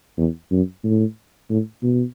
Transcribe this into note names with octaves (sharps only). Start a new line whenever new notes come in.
E2
F#2
A2
A2
B2